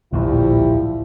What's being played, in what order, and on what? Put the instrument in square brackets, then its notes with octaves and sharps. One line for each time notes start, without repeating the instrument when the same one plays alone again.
[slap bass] D1 A#1 D#2 [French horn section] F3 G3 E4